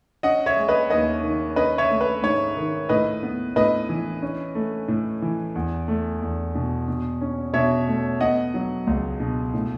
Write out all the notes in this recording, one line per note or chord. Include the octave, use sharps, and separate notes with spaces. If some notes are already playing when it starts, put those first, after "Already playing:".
C#4 D#5 F#5
C#5 E5
G#3
B4 D#5
D#2 B4 D#5
D#3
C#4 B4 D#5
C#5 E5
A3
B4
G#2 C#5
D#3
A2 B4 D#5
B3
A2 B4 D#5
E3
C#4
A3
A2
E3
E2
A3
E2
B2
B2
C#4
B2 C#5 E5
A3
B3 D#5 F#5
F#3
C#2
B2
A2